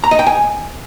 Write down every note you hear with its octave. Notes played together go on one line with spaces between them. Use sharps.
A#5
D#5
G5
G#5